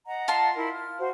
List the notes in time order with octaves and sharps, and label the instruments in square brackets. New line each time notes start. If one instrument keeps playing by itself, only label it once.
[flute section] D#5 F#5 A#5
[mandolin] F4 A5 C6
[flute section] E4 A#4 B5
F6
F#4 C5